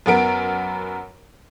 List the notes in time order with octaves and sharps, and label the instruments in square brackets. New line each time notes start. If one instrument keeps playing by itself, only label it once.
[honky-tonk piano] F#2 B3 A#4 D7